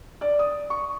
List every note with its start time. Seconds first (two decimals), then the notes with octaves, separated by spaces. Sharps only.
0.21 D5
0.39 D#6
0.70 C#6